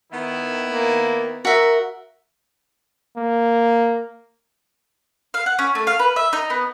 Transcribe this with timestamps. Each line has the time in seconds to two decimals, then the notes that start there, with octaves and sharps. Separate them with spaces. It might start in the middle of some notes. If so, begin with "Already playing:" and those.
0.12 D#3 B3 E4
0.66 A#3
1.45 F#4 A#4 E5
3.17 A#3
5.34 F5
5.46 F#5
5.59 C#4
5.75 A3
5.87 F5
5.99 B4
6.16 E5
6.33 D#4
6.50 B3